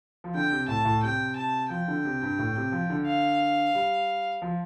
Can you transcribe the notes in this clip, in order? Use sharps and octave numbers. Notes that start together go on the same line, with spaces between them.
F3
D3 G5
C3
A2 A5
A2
C3 G5
A5
F3 G5
D3
C3
G2
A2
C3
F3
D3
F5
G3
F3